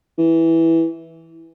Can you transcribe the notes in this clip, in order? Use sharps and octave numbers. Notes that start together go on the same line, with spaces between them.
E3